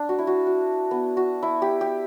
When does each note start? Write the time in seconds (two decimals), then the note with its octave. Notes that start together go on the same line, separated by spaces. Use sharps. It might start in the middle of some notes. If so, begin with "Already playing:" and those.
Already playing: D4
0.09 F#4
0.19 E4
0.27 F#4
0.47 F#4
0.91 B3
1.17 F#4
1.43 E4
1.62 G4
1.81 G4